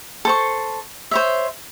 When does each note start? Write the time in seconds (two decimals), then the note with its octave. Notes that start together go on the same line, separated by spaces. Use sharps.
0.25 A4 C5 C#6
1.11 C5 C#5 E5